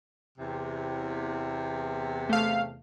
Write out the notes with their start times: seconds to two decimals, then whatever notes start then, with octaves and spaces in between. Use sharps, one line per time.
0.38 E2 C3
2.29 A3 F5